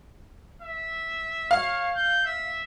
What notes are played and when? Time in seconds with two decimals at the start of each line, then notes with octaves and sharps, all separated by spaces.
0.62 E5
1.51 C#5 F5
1.95 G6
2.25 E5